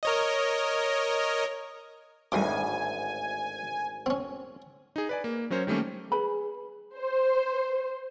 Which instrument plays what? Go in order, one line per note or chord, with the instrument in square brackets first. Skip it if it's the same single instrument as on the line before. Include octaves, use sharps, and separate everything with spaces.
[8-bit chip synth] A#4 C#5 D#5
[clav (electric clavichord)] G#1 D2 A2 [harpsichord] G3 C6 D6 [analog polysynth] G#5
[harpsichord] C4 C#4
[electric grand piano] D#4 G#4
B4 D5 G#5
A#3
F#3 C#4 A#4 C5 C#5
D#3 G3 A3 A#3 C#4
[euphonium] G#4 [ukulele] B4 B5
[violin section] C5